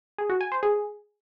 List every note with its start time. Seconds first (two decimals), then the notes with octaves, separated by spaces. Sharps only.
0.18 G#4
0.30 F#4
0.41 G#5
0.52 C5
0.63 G#4